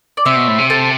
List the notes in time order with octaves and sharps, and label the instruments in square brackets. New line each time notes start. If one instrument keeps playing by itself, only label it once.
[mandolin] D5
[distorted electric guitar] C3 [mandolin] C5 E5
[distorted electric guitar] B2
A2
C3
[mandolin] A4 C5